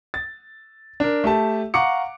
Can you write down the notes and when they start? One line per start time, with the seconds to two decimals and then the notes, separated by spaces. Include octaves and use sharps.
0.14 A6
1.00 D4 A#4
1.24 A3 G4 A5
1.74 F5 F#5 A#5 C#6 D6 C#7